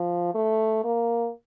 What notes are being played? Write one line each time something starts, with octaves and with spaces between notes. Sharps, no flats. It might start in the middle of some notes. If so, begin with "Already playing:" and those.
Already playing: F3
A3
A#3